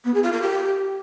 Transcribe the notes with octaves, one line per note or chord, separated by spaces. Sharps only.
B3
G#4
F4
A#4
G4